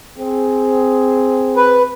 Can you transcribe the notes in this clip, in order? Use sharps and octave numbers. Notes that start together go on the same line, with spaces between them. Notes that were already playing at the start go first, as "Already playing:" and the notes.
C4 G#4
B4